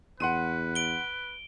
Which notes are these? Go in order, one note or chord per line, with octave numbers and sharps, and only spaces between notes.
E2 B4 F#5 C6 D#7
D7 G7